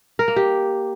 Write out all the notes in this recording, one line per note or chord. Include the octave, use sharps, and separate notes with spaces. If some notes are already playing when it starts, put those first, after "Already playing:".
A#4
A#3
G4